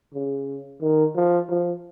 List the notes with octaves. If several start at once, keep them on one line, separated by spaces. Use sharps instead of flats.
C#3
D#3
F3
F3